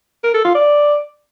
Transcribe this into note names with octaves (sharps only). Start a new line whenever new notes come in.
A#4
A4
F4
D5